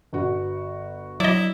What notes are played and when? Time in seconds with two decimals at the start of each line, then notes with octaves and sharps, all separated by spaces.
0.13 G1 F#4
1.20 F#3 E4 D5 D#5